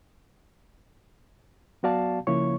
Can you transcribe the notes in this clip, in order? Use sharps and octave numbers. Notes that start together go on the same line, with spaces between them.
F#3 B3 F#4 D5 F5 A5
C#3 F3 A#3 E4 C#5 C#6